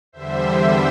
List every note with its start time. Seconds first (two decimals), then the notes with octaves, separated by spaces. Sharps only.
0.12 E2 D3 G3 C5 E5
0.56 C5 E5